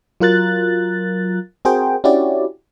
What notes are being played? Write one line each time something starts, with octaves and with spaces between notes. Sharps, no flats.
F#3 F4 A#4 F#6 A6
C4 F#4 G#4 A#4 C5 G5
C#4 D4 E4 F#4 G4 D5